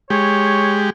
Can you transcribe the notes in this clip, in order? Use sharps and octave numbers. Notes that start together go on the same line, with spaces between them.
G#3 G4 C#5